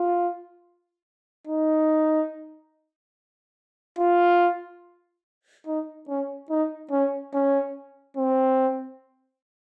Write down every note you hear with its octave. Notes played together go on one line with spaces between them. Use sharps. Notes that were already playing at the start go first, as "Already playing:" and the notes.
Already playing: F4
D#4
F4
D#4
C#4
D#4
C#4
C#4
C4